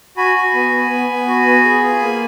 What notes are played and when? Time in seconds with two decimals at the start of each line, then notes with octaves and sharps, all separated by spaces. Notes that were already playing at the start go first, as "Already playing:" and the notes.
0.17 F#4 G#5 B5
0.36 F#4
0.54 B3
0.72 B3
0.91 B3
1.09 B3
1.28 F#4
1.47 B3
1.65 G#4
1.84 F4
2.02 A#3